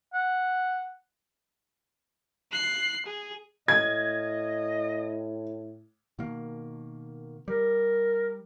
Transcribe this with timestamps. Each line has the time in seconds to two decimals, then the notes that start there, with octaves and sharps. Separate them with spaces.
0.14 F#5
2.52 F#6 C7
3.06 G#4
3.68 A2 D#5 G#6
6.19 B2 D#3 A#3
7.48 G3 A#4